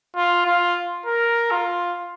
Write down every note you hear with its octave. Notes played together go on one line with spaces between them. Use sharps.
F4
F4
A#4
F4